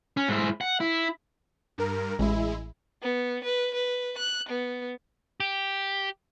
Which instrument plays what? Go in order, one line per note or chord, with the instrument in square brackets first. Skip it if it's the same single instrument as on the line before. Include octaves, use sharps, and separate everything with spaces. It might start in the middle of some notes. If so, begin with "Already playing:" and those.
[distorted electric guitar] C#4
G#2 E4
F#5
E4
[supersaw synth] G2 A#4
[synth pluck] A1 [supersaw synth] G#3 E4
[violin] B3
B4
B4
F#6
B3
[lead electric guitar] G4